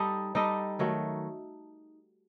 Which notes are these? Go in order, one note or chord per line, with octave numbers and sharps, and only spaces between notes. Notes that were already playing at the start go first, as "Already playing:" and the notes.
Already playing: G3 D#4 A4 D#5
G3 D#4 A4 D#5
D#3 F#3 A3